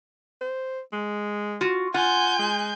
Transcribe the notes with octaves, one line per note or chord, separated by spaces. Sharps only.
C5
G#3
F4 F#4
F4 F#5 G#5 G6
G#3